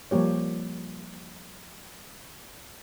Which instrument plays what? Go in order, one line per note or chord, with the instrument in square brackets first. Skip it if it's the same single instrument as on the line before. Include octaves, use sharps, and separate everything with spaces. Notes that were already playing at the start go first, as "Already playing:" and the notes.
[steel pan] F3 G3 A#3 G4 C#5